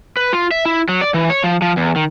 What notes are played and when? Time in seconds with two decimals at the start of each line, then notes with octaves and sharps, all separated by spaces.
0.17 B4
0.33 F4
0.51 E5
0.65 E4
0.89 F#3
1.01 D5
1.14 E3
1.30 C#5
1.44 F3
1.62 F3
1.77 E2
1.96 D#3